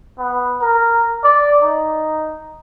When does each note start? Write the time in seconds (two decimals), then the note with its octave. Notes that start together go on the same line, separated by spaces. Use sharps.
0.19 B3
0.61 A#4
1.24 D5
1.62 D#4